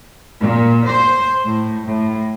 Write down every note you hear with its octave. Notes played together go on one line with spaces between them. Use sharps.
A#2
C5
A2
A2